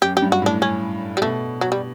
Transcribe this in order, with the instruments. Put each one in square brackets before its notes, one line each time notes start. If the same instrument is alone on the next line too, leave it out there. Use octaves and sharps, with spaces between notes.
[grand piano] F#2 [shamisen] G4
[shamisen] G4
[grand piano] G2
[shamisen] F#4
[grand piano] A2 [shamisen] D4
[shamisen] C#4
G3
[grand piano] B2 [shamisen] A3
[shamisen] F#3
G3